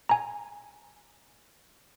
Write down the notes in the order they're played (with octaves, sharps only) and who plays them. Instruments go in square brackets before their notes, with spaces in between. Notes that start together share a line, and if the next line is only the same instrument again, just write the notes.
[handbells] G#5 A#5